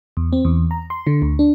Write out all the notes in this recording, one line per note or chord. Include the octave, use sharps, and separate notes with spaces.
E2
C4
E2
A#5
C6
D3
D2
D4